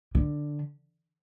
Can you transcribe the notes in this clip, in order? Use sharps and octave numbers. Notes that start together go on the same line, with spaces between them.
D3